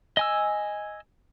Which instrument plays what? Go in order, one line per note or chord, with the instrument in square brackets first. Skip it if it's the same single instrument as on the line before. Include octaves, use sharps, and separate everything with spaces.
[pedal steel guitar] D#5 G#5 E6